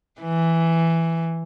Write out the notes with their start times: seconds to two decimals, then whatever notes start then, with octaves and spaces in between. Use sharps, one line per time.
0.21 E3